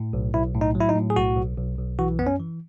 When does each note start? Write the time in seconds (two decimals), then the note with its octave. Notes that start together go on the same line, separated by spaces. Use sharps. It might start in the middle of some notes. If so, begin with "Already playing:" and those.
Already playing: A2
0.13 B1
0.34 B1 E4
0.55 A2
0.61 D#4
0.75 F#3
0.80 E4
0.89 D#4
0.96 A2
1.10 G#4
1.16 B1 F#4
1.37 B1
1.58 B1
1.78 B1
1.99 E3 F#4
2.19 F#2 B3
2.27 C#4
2.40 E3